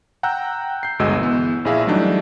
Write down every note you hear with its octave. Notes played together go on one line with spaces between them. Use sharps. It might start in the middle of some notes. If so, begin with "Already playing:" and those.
F#5 G5 A#5 E6 F#6 G6
G6 C7
G1 D2 B2 G#3 D#5 E6
E3 B3
A#1 E4 G#4 E5 F5 B5
E3 F#3 G3 A3 D4 D#4